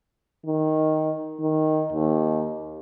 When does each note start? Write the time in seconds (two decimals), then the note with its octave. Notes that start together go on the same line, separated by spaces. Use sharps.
0.46 D#3
1.40 D#3
1.93 D#2